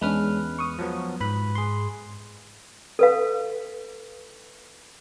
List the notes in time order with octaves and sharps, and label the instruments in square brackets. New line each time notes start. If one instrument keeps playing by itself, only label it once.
[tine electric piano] E2 B4 F6 [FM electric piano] G#3 C#4 D4
[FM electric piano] C#6 D#6
[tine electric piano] F3 F#3 B3
[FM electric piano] G#2 [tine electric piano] B4 B5
[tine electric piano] G#4 C6
[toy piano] A4 B4 F5